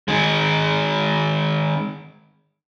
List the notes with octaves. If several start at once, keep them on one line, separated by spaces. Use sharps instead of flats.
D#3 G#3